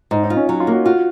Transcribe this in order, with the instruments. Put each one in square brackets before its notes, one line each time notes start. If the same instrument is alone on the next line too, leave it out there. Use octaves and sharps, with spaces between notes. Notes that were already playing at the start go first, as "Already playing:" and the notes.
[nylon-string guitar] G#2 [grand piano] D#4
[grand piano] D#4
[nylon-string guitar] F4
[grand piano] C#4
[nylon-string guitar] F#3 [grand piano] D#4
[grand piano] F4
[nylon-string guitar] A#3
[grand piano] F#4
[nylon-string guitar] F4 [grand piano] F#4